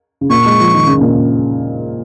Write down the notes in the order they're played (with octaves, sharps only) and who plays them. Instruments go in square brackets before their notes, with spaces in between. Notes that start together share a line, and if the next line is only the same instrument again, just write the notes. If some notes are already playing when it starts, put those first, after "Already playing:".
[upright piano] C#3
[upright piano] A#2 [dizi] C#6
[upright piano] G#3
F3
D#3
C#3
A#2